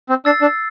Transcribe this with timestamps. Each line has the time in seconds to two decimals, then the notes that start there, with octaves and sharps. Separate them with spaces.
0.09 C4
0.25 D4 E6 A6 C7
0.41 D4